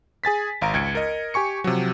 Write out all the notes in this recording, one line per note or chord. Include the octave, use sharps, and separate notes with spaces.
G#4 G#5 A6 B6
G#1 F5 A#5 D7
C#2 G#6 C#7
A#4 D#5
G4 G#5 C#6 C#7
C3 F3 F#3